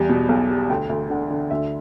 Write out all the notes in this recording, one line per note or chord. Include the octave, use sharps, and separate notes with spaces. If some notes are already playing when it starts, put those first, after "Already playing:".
Already playing: E2 G3
B2
B1
G3
D2 G5
D2
D3 F#5
D3
D2 E5